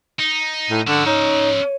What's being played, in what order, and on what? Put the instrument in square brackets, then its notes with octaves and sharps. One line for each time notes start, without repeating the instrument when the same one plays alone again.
[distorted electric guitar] D#4
[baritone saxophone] A2
[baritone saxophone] D3 [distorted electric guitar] C#4 E5
[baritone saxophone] D#4 [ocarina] C#5